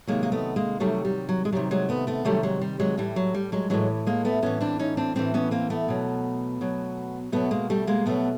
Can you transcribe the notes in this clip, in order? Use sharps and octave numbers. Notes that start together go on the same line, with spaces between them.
C3 D#3 F#3 G#3 A#3
A#3
A3 B3
G#3 A#3
C3 D#3 F#3 G3 A3
G3
F#3
G#3
C3 D#3 F#3 G3
F#3 G#3
A3 B3
A3 B3
C3 D#3 F#3 G3 A3
F#3 G#3
G3
F#3 G#3
A2 E3 G3
F#3
G3
F#3 G#3
A2 E3 F#3 G#3
G#3 A#3
A3 B3
A2 E3 B3 C#4
C4 D4
C#4 D#4
C4 D4
A2 E3 C4 D4
B3 C#4
A#3 C4
A3 B3
B2 F#3
B2 F#3
B2 F#3 A3 B3
G#3 A#3
G3 A3
G#3 A#3
B2 F#3 A3 B3